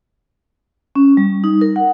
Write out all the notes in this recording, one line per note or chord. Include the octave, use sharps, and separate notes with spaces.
C#4
G3
D#4
A#4
F#5